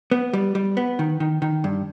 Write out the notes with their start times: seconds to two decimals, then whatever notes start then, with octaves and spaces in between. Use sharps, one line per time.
0.11 B3
0.33 G3
0.55 G3
0.77 B3
0.99 D#3
1.20 D#3
1.42 D#3
1.64 G2